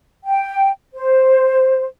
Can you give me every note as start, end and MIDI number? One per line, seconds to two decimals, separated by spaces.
0.24 0.67 79
0.93 1.85 72